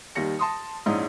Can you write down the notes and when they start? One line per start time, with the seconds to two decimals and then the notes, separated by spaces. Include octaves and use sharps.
0.15 D#2 D#3 G3 A#6 C#7
0.39 A5 C6 D#6
0.86 A#1 G#2 C#4 D#4 E4 D#6